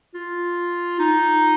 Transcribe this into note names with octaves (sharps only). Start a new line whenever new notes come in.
F4
D#4